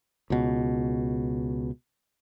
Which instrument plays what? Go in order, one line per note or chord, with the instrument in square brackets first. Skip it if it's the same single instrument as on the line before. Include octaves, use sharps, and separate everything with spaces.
[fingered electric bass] C#2 B2